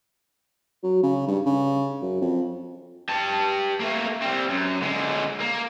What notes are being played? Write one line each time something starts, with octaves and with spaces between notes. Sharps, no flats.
F#3
C#3
G2
C#3
F#2
F2
G4 A5
A3 A#3
G3 C4
F#2
D3 G#3
A#3